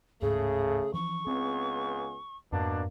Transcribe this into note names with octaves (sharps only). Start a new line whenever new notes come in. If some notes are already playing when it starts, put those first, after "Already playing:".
D1 G#2 C#3 A3 G#4
E3 F3 C#4 C#6
C#2 B3 C4 G#4
F2 G#2 B2 A#3 D4